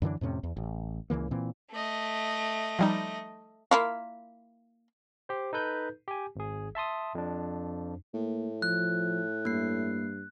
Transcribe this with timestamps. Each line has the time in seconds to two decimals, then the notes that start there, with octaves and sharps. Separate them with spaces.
0.02 F#2 D3 E3 D4
0.21 F2 A2 C3 C#4
0.43 E2
0.57 A1
1.10 C#2 C#3 E3 A#3
1.31 A#2 E3 C4
1.72 A3 D#5
2.79 F3 G3 D#4
3.71 A#3 E4 F4
5.29 G4 C5
5.53 D#4 A4 B4 G6
6.08 G4 G#5
6.36 G#1 G#4
6.75 E5 A5 C6 D#6
7.15 F2 D4
8.14 A2 A#3
8.62 F3 F#6
9.45 G2 A#3 C7